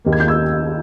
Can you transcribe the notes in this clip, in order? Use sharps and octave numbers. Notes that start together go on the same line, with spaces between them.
D#2 D#3 A#3
G#6
G6
E6 G#6